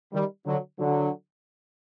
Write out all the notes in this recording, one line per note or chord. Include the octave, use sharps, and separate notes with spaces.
D#3 G3
D3 F#3
D3 F#3